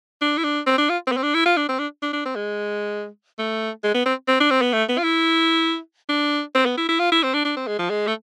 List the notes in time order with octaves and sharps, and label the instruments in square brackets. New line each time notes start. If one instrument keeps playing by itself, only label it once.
[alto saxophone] D4
E4
D4
C4
D4
F4
C4
B3
C4
D4
E4
F4
D4
C4
D4
D4
D4
C4
G#3
A3
G#3
B3
C4
C4
D4
C4
B3
A3
B3
F4
E4
D4
C4
B3
E4
E4
F4
E4
C4
D4
D4
C4
G#3
F3
G#3
A3